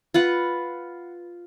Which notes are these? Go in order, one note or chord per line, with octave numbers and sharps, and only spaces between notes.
F4 B4 F#5